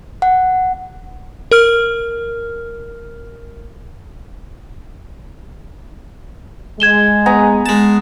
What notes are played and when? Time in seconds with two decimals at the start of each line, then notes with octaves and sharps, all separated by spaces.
0.22 F#5
1.51 A#4 F6
6.80 G#3 G#6 E7 G7
7.26 B3 G#5 A#5
7.66 G#3 A5